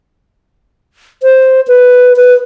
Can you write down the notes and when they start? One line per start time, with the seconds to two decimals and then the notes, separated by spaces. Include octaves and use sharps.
1.23 C5
1.68 B4
2.16 B4